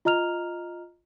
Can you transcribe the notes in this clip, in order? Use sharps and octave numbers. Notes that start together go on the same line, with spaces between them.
F4 D#5 A#5 F6 F7